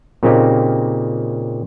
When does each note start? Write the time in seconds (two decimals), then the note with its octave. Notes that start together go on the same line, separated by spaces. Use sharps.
0.23 A#2 C#3 A#3 C4 D#4 G4